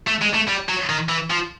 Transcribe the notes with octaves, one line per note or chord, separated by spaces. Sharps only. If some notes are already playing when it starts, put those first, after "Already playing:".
A3
G#3
A3
G3
F#3
D#3
E3
F3